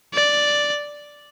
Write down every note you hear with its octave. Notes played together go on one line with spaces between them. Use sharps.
D5